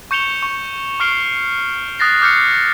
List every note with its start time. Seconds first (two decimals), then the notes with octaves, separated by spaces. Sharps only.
0.11 C#6 G6 C#7 E7 F7 G7
0.43 C#6
1.00 C#6 F6 C7 D7 G7
1.99 D#6 F#6 A6 A#6 C7
2.21 D6 F6 G6 C7 C#7